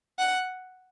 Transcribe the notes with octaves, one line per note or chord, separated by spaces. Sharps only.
F#5